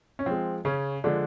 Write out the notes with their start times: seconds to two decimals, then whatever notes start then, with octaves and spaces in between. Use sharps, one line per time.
0.19 C#4
0.26 F3 G#3 C4
0.65 C#3 C#4
1.04 D3 F3 G#3 D4